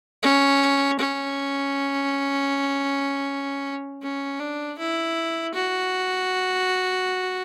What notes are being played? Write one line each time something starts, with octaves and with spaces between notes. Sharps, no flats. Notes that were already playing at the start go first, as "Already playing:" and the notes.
C#4
C#4
C#4
D4
E4
F#4